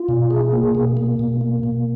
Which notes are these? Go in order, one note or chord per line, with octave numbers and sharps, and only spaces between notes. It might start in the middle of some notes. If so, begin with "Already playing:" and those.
Already playing: F4
B2
G#4
A#3
B2
A#3
B2
A#3
B2